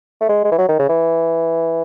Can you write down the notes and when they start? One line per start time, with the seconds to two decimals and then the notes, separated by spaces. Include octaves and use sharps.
0.21 A3
0.29 G#3
0.44 G#3
0.52 E3
0.58 F#3
0.68 D#3
0.79 C#3
0.89 E3